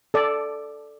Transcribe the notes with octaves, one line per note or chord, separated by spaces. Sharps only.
A4 D5